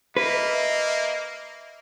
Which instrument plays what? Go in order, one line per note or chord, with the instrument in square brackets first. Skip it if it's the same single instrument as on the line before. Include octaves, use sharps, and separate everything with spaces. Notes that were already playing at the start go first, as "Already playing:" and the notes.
[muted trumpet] A#3 [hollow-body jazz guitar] B4 [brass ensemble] D#5 E5